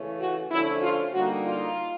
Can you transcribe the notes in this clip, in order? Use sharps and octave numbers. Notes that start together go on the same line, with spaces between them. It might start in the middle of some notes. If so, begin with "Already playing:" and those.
Already playing: C#3 E3 A3 C#4
F#4
D3 F3 A3 C#4 E4
F4
D3 G3 A#3 D#4 F#4
F4